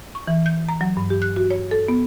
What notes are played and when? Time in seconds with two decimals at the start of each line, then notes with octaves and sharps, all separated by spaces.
0.15 C#6
0.27 E3
0.46 G6
0.69 A#5
0.81 F#3
0.97 G2
1.10 G4
1.22 F#6
1.36 F#4
1.50 C#5
1.71 A4
1.88 B3